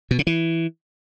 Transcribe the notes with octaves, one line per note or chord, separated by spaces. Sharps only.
B2
C#3
E3